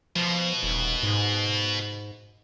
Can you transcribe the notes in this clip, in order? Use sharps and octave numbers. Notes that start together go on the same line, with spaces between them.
B2 F3
D#1
G#2